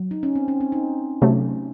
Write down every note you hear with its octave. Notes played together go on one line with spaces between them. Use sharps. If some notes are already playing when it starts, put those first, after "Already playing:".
Already playing: F#3
D#4
C#4
C4
C#4
C4
D#4
C3 F#3 A3 C#4